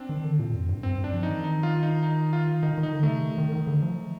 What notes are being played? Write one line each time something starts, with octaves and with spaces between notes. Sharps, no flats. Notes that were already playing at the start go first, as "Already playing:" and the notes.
Already playing: C4 D4
D#3
D3
A#2
F2
G2
G2 C4
G2
D4
F3
D#4
D#3
D#4
F4
D#4
D#4
F4
D#3 D#4
D#3
D#4
D3
C3 A3
D#3
D#3
D#3
D3
F3